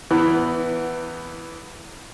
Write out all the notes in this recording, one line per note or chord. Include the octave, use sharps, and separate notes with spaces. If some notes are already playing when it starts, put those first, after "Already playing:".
E2 E3 B3